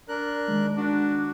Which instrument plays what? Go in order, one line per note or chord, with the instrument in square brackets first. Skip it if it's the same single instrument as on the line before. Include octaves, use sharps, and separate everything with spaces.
[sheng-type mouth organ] D4 A#4 F#6
[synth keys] D#3 G#3
[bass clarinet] D4 [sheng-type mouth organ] F#4